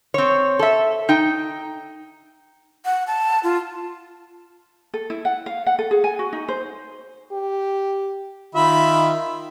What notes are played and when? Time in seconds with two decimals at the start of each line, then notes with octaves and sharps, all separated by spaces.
0.14 C4 C#5
0.59 A4 E5
1.09 D#4 G5
2.85 F#5
3.07 A5
3.43 F4
4.94 A4
5.10 E4
5.25 F#5
5.46 F5
5.66 F#5
5.79 A4
5.91 G#4
6.04 G#5
6.19 F#4
6.33 D#4
6.48 C5
7.32 G4
8.55 D#3 F4 E5 B5